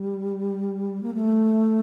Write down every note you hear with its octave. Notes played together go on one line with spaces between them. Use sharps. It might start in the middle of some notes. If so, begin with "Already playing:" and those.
Already playing: G3
A#3
A3